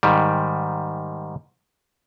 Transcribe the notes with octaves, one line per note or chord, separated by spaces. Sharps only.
G#2 D#3 G3